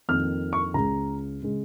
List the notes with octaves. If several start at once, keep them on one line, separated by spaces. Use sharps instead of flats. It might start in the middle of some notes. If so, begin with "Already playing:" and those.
F2 D#3 A#3 F6
C#6
C#2 C#3 G#3 A#5
C#3 G#3